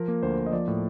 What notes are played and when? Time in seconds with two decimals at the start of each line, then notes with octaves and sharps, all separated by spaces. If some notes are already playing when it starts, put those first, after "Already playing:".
Already playing: F3 A#4
0.08 A#3
0.23 D2 C5
0.38 A#3
0.46 D#5
0.53 F3 D5
0.67 A2